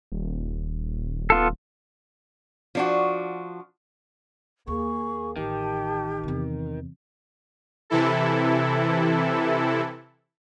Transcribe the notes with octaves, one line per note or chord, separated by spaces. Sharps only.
D#1
B3 F4 A4
F3 D4 F#4
D#2 A#3 G#4 C#6
A1 D#3 G4 G5 A5
E2 C3
C3 E3 E4 A4